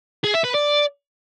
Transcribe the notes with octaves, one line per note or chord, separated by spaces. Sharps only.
G#4
E5
B4
D5